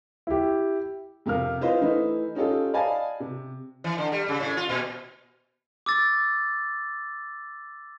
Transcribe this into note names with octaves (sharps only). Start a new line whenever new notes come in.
E4 G4
F2 C3 C4 A#4 F5 F6
E4 F4 B4 C5 D#5 F5
E3 A3 D#4 E4 B4
C#4 D#4 F4 G4 A4
D5 D#5 F5 G#5 A5 B5
C3
E3
D3
G3
C#3
A2
F4
A#2
D6 E6 A6